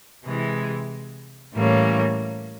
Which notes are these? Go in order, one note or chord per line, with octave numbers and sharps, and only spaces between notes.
C3 E3 G#3
A2 E3 G3 A#3 C#4